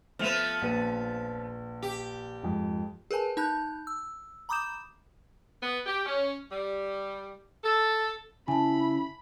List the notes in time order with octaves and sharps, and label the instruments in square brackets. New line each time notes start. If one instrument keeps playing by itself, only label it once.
[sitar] F3 B3 [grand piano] A3 E5 F7
[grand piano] A#1 B4 D#7
[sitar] G4
[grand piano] F2 G#2
[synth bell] G#4 A#4 B4 G#5 A5
D#4 A5 F#6 G6
E6
A#5 B5 D6 D#6 G6 E7
[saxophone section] B3
G4
C#4
G3
A4
[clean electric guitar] C#3 [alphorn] E4 [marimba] G#5 A5 [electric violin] B5